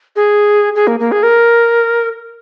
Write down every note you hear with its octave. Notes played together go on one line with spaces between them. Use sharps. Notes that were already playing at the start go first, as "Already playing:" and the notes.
G#4
G#4
A#3
A#3
G#4
A#4